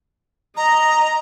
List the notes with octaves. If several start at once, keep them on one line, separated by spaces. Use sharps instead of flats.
D#5 A#5